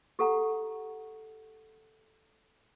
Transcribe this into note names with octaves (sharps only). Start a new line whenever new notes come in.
G4 A4 F#5 A#5